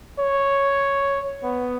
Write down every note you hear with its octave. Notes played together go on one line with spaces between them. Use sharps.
C#5
B3